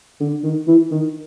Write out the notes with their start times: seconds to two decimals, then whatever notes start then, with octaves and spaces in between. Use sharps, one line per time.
0.20 D3
0.43 D#3
0.67 E3
0.91 D#3